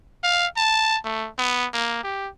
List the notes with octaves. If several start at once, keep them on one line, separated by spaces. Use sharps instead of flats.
F5
A5
A3
B3
A#3
G4